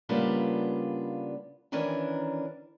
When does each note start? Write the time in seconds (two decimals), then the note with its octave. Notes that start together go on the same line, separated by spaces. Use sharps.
0.09 C#3 G3 A#3 B3 D4 F4
1.72 D#3 E3 C#4 D4 A#4